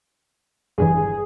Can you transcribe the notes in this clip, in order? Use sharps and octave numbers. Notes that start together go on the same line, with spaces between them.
G1 G2 E3 G#4